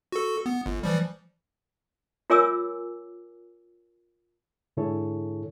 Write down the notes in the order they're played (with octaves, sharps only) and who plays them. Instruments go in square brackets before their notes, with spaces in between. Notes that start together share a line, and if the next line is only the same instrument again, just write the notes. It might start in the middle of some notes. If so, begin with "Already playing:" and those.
[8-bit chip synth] F#4 A4
B3
G1
E3 F3 G3
[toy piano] F4 A#4 C#5 G#5 D6 E6
[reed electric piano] G#2 D3 E4 G#4 A4 C#5